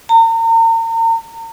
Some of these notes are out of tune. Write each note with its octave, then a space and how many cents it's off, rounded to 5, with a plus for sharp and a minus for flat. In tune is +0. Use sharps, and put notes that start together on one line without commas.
A#5 -40